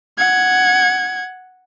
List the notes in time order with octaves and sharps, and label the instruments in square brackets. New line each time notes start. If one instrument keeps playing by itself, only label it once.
[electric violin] F#5 G#6